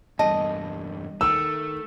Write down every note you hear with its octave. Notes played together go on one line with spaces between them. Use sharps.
E2 G2 D#5 A5
D#3 A3 E6